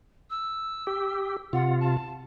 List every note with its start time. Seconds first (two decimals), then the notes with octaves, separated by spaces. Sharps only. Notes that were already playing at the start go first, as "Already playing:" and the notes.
0.30 E6
0.87 G4
1.53 C3 F4 F#5
1.80 A5